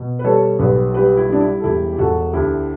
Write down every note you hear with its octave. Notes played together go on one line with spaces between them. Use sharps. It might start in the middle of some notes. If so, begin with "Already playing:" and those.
Already playing: B2
B4
G3 A4 C#5
B1 G4 B4
G3 G4 B4
E4
G3 D4
E4
A4
E1 E4 G4
G4
E1 F#4 A4
D2 E4 G4